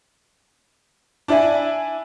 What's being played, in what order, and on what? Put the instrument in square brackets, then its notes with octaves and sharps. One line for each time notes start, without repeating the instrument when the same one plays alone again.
[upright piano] D4 E4 D5 E5 G#5